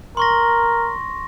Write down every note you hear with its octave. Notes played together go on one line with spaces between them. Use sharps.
A#4 C6 C#6 A#6